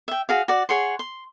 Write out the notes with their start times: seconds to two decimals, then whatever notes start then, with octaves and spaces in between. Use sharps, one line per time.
0.08 E5 G5
0.29 F#4 G#4 F5
0.48 F#4 D5
0.69 G#4 C#5 F#5 C6
0.99 C6